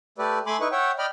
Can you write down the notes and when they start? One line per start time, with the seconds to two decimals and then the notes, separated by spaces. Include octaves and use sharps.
0.18 A3 G4 A4 B4 D5
0.46 A3 G#5 B5 C6 D6
0.60 D#4 E4 B4 C#6
0.72 C#5 E5 F#5 G5
0.99 D5 D#5 G5 B5 F6